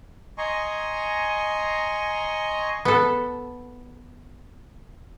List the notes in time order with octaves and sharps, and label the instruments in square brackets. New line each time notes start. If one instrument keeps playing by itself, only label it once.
[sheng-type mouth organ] D#5 G#5 A#5 C6 C#6
[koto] B3 A4